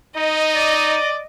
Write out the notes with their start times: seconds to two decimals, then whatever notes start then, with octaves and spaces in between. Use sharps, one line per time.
0.17 D#4 D#5
0.55 D5